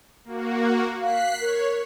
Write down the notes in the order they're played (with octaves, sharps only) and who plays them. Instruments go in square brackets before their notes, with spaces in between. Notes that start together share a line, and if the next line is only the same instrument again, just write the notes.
[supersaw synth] A#3 F#4
[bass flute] F5 [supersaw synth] F#6 B6 C7
[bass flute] A#4 [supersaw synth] C#5